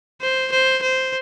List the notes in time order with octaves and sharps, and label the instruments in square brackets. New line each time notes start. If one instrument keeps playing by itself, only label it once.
[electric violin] C5
C5
C5